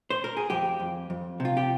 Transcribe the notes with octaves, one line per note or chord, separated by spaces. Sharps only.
C5
A#4
G#4
F2 G4
F2
F2
C3
F4
G4